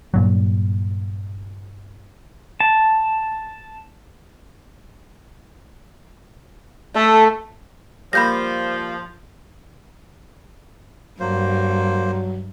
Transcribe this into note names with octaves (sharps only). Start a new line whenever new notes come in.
G2 A#2 F#3
A5
A3 A4
F3 G3 A#3 B5 G6 A#6
G2 F#3 A#3 C5